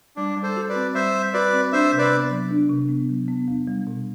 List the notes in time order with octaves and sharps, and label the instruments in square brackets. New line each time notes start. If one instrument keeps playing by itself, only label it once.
[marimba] G3 [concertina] D4
[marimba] G3
[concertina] A4 C5
[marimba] F#4
[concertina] B4 D5
[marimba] C4
[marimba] G3 [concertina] C5 E5
[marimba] G3
[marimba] F#4 [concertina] B4 D5
[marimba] C4
[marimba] D4 [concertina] C5 E5
[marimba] C3
[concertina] B4 D5
[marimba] B3
F#3
D4
C3
B3
F#3
B3
E2
G3
B2